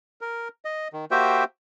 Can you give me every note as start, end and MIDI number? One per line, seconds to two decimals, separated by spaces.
0.21 0.48 70
0.65 0.88 75
0.93 1.05 51
1.11 1.44 58
1.11 1.44 66
1.11 1.44 67
1.11 1.44 72
1.11 1.44 76
1.11 1.44 79